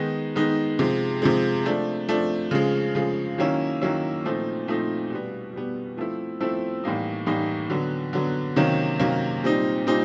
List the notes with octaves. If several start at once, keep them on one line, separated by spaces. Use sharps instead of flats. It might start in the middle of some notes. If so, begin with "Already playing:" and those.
Already playing: D#3 G#3 B3 D#4
D#3 G#3 B3 D#4
C3 F3 G#3
C3 F3 G#3
F3 A3 D4
F3 A3 D4
C#3 F3 G#3
C#3 F3 G#3
D#3 F#3 A#3 C#4 E4
D#3 F#3 A#3 C#4 E4
A#2 F3 A3 C4 D#4
A#2 F3 A3 C4 D#4
B2 G3 B3
B2 G3 B3
F3 A3 C4 E4
F3 A3 C4 E4
A2 E3 G3 A#3 D#4
A2 E3 G3 A#3 D#4
D3 F#3 B3
D3 F#3 B3
C3 D#3 F#3 A#3 C#4
C3 D#3 F#3 A#3 C#4
A#2 G3 C4 D#4
A#2 G3 C4 D#4